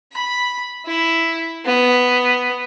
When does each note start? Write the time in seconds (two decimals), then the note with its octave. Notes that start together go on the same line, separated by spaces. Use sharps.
0.13 B5
0.86 E4
1.66 B3